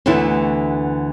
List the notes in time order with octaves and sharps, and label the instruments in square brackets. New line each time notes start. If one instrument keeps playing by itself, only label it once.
[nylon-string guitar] D2 D3 E3 A3 B3 E4